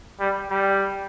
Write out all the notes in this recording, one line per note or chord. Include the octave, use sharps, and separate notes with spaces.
G3
G3